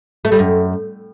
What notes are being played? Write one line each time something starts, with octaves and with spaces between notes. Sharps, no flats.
A3
G3
F#2